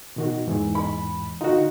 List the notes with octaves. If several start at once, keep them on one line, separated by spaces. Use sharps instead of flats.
B2 D#3 F#4
E2 G#2 E3
B5
D3 D#4 F4 F#4